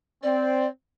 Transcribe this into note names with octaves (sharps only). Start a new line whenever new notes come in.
C4 D5